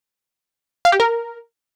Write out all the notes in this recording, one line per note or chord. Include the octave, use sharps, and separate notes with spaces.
F5
G4
A#4